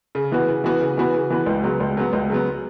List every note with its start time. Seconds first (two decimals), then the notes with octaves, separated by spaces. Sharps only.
0.15 C#3
0.32 E3 B3 F#4 B4
0.48 C#3
0.64 E3 B3 F#4 B4
0.80 C#3
0.97 E3 B3 F#4 B4
1.14 C#3
1.30 E3 B3 F#4 B4
1.46 C#2
1.63 C#3 F#3 B3
1.80 C#2
1.96 C#3 F#3 B3
2.13 C#2
2.30 C#3 F#3 B3